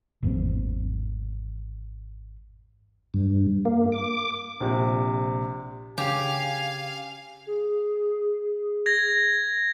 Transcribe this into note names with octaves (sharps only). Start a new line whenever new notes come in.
G#1 E2 E3 C4
G2
A#3
D6
A#1 C3
C#3 G4 F5 G#5
G#4
G#6 A#6